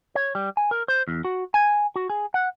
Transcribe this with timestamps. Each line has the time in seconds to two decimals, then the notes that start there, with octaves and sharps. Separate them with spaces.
0.15 C#5
0.35 G3
0.57 G#5
0.71 A#4
0.88 C5
1.08 E2
1.25 F#4
1.54 G#5
1.96 F#4
2.10 G#4
2.34 F#5